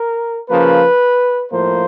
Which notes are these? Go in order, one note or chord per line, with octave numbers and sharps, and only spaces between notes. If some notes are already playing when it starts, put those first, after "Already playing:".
Already playing: A#4
C#3 F3 A#3 B4
A2 F3 A#3 C5